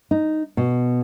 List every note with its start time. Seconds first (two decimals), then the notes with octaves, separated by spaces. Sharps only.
0.11 D#4
0.57 B2